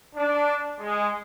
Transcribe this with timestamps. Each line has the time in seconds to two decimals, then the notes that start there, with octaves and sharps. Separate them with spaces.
0.16 D4
0.80 G#3